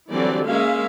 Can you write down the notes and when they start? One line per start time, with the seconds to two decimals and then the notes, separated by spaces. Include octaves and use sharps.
0.12 D3 E3 F#3 G3 C4 D5
0.47 G#3 A#3 C#4 E5 F5